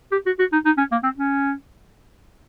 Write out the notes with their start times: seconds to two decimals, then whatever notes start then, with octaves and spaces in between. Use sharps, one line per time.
0.12 G4
0.26 F#4
0.39 F#4
0.52 D#4
0.65 D#4
0.78 C#4
0.91 A#3
1.03 C4
1.17 C#4